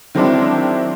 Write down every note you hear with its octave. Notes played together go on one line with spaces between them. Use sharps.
D#3 F#3 G#3 C4 D4 E4